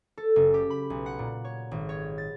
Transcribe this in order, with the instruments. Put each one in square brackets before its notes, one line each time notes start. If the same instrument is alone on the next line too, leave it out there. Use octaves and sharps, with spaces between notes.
[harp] A4
F#1
G4
B5
B1
F#5
A#2
C#5
G#1
C#5
A6